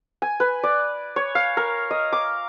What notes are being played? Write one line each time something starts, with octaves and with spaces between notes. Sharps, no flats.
G#5
B4
D5
C#5
F5
A#4
D#5
D6